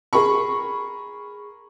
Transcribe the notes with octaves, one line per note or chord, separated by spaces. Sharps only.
G#4 A#4 B5 C#6